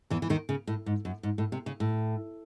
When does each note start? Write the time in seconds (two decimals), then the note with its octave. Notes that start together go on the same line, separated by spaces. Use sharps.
0.10 E2 E3
0.22 E3
0.30 D#2 D#3
0.49 C#3
0.67 A2
0.86 G#2
1.05 F#2
1.23 G#2
1.38 A2
1.52 C3
1.66 C#3
1.80 A2